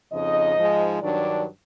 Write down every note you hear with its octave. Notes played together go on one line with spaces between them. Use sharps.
F2 C#3 F3 D#4 D#5
G#2 F3 G#3
G2 D#3 F#3 D4 D5